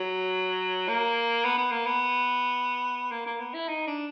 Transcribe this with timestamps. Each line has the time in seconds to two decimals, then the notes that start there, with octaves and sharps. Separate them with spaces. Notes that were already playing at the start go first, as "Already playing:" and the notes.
Already playing: F#3
0.88 A#3
1.45 B3
1.57 B3
1.71 A#3
1.86 B3
3.11 A#3
3.26 A#3
3.40 B3
3.54 E4
3.68 D#4
3.87 D4